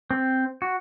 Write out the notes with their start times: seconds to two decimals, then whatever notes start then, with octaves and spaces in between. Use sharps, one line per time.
0.11 C4
0.62 F#4